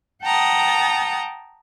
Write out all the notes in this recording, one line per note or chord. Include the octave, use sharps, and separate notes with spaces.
F#5 G5 A5 A#5 D#6